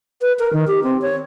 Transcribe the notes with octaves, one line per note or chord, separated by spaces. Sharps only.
B4
A#4
D#3
G4
C4
C#5